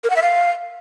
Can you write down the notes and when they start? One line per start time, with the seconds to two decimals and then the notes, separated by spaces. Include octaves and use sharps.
0.04 A#4
0.10 F#5
0.16 E5
0.22 F5